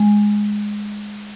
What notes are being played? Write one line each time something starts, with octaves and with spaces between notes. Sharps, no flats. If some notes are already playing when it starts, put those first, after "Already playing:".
Already playing: G#3